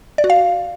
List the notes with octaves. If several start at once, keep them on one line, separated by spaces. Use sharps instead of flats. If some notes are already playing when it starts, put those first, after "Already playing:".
D5
F#4
F5